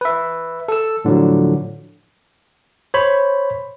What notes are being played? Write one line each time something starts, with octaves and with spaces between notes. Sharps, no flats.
B4 E5
A4 E6
A2 D3 F3 F#3
C5 C#5 B5